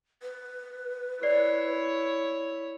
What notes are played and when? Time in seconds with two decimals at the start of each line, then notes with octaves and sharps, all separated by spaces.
0.22 B4
1.23 E4 C#5 D5 C7